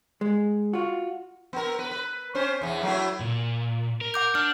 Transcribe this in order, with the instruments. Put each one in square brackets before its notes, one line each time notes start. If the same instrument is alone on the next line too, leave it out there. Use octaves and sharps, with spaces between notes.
[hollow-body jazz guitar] G#3
F4 F#4
[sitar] B3 A#4
B4
B4
C4 C#4 C5
E2 E3
F#3 A3 E4
[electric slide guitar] A#2
A#4
[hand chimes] F#5 D6 G6
[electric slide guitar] D4 [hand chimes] F6